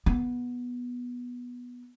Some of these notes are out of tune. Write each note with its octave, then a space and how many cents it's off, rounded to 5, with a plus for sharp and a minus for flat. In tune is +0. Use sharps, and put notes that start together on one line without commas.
B3 -10